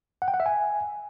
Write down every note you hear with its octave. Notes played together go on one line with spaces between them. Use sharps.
F#5
G5
F#5
E5
G#5